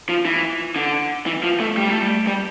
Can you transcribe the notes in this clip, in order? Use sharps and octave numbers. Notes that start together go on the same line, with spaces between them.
F3
E3
D3
E3
F3
A3
G3
A3
G3
G3